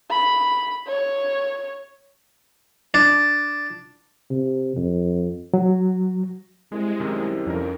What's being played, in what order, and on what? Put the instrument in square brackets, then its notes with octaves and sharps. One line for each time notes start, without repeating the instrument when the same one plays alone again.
[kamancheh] B5
C#5
[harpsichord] D4
[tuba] C3
F2
[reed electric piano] F#3
[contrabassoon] C2 [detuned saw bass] G#3
[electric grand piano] F#2 C3 D#3
[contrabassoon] C2
[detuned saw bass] F2 [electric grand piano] C#4 D#4 A#4